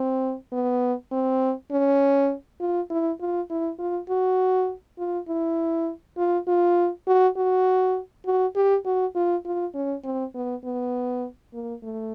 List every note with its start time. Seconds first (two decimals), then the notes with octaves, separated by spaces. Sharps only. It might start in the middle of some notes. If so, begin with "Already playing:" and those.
Already playing: C4
0.52 B3
1.12 C4
1.71 C#4
2.60 F4
2.90 E4
3.20 F4
3.50 E4
3.79 F4
4.10 F#4
4.99 F4
5.28 E4
6.17 F4
6.47 F4
7.07 F#4
7.37 F#4
8.26 F#4
8.56 G4
8.85 F#4
9.15 F4
9.45 F4
9.75 C#4
10.04 C4
10.34 B3
10.64 B3
11.53 A#3
11.83 A3